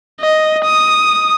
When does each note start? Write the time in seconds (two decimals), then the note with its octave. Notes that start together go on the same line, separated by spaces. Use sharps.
0.21 D#5
0.64 D#6